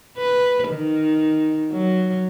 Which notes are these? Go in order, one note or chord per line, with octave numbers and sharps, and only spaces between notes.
B4
D#3
F#3